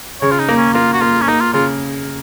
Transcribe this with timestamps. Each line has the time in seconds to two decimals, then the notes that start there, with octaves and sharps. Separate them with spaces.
0.22 C#3 C#5
0.32 F4
0.40 D#4
0.49 A#3
0.57 C#4
0.74 A#3 F4
0.93 F#4
1.01 A#3 F4
1.22 C#4
1.28 A#3 D#4
1.41 F4
1.53 C#3 F4